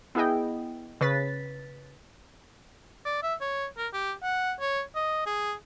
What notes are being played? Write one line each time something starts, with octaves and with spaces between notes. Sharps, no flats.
B3 E4 G#4 D#5 G5
C#3 B4 C#5 A6 B6
D5
E5
C#5
A#4
G4
F#5
C#5
D#5
G#4